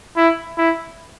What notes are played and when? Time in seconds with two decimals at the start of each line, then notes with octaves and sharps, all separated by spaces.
0.17 E4
0.58 E4